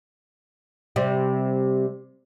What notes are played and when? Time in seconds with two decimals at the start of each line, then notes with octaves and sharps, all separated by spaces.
0.96 C3 G3